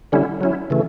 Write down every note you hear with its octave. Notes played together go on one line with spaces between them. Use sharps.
D3 G3 C#4 E4
F#3 C#4 E4
C#3 E3 A3